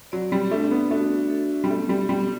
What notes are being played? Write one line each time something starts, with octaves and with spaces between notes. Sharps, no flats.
F#3 D5
G3
A3 D4
B3
A3 F#4
A4
G3
A3 B3
G3
G3 B3